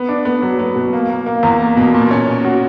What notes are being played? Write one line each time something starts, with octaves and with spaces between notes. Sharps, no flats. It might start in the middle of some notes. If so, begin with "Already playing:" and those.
Already playing: B3
D4
B3
F#3
B3
B2
A#3
A#3
A#3
E2
A#3
B2
A#2
C#4
C#4
F#4